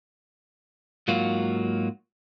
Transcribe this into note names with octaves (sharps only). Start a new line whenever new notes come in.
G#2 F#3 A#3 F4 F#4